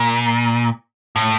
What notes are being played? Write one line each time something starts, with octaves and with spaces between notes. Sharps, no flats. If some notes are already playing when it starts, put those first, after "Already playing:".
Already playing: A#2
A2